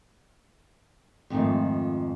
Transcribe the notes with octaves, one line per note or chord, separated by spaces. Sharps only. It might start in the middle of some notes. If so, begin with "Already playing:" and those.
F2 G#2 D#3 F3 A3